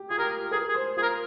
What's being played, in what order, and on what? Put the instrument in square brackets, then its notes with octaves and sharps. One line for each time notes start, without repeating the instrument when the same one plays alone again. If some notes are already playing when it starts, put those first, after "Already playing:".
Already playing: [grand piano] G4
[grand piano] F4 [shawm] G#4
[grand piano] G4 [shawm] A#4
[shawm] G#4 [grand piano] A#4
[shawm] G#4
[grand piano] C5
[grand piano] F4 [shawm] G#4
[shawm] A#4